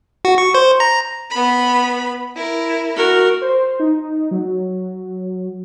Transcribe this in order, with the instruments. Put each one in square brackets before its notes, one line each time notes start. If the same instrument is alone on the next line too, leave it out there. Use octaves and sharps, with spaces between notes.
[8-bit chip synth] F#4
C#6
C5
A#5
[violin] B3 B5
E4 A#4
[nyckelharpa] F#4 A#4
[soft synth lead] C5
D#4
F#3